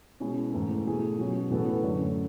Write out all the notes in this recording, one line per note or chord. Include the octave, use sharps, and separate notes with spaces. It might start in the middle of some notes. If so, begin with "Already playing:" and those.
B2 G#3 C#4 E4 G#4
G#2 E3 A3
B2 A3 E4 G#4
B2 F#3 C#4
A2 E3 B3 F#4 A4
F#2 D3 A3